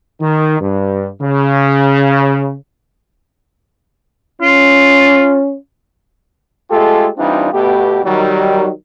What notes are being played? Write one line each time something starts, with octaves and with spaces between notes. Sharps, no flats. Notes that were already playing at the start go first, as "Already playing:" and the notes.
D#3
G2
C#3
C#4 F4
G#3 A3 F4 G4 A4
E3 G3 C4 D4 D#4 F4
B2 A3 B3 G4
D#3 F#3 G3